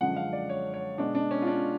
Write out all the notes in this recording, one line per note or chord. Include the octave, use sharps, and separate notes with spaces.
F#2 D3 F3 G#3 F#5
F5
D5
C#5
C#5
B2 G#3 D4
D4
C#4
F4
D4